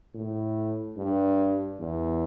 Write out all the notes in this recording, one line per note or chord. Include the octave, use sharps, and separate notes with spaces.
A2
G2
E2